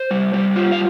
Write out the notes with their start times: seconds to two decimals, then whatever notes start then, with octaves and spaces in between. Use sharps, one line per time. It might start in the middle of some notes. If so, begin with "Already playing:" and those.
Already playing: C5
0.11 G3
0.34 G3
0.56 F4
0.72 F5